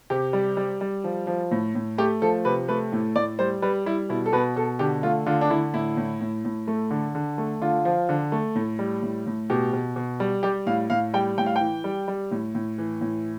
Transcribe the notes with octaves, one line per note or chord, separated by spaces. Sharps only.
C3 G4
G3
G3
G3
F3
F3
A2
A2
A3 G4
F3 A4
C3 B4
A3 B4
A2
A2 D5
G3 C5
G3 B4
G3 E4
B2 E4
A4
B2 B4
B2 A4
D3 G4
A3 F4
D3 F4
D4
D3 E4
A2 E4
A2
A2
A2
A3
D3
D3
A3
D3 F4
F3
D3
A3
A2
G3
A2
A2
B2 G4
B2
B2
G3
G3 G4
A2 F5
A2 F5
G3 G5
A2 G5
F5
E3 G5
G3
G3
A2
A2
E3
A2